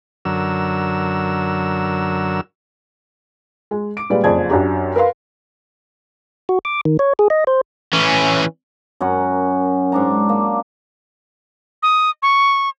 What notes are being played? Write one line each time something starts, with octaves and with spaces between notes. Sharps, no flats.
F#2 D3 F#3 A#4 E6
G#3
D6 D7
A#2 G3 G#3 B4 D5
F#1 F2 G#4 D5 G#6
F#2 D4 G4 A#5
A#4 B4 F5 C6
F#4
D6
D#3
C#5
G#4
D#5
C5
E3 C#4
F#2 C#4 A#4 F#5
G#2 D4 A#5
A#3
D#6
C#6